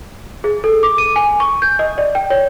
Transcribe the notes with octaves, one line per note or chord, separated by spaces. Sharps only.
G#4
A4
D6
D#7
G#5
C#6
G6
D#5
D5
G5
C#5